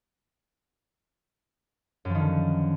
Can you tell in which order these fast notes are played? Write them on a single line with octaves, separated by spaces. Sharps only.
F#2 F3 D#3 D3